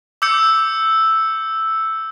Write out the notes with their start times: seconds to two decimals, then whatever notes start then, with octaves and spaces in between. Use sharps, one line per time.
0.22 D6 E6 G6 C#7